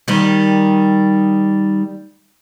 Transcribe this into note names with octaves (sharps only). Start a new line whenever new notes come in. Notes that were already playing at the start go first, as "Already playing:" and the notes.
D#3 G3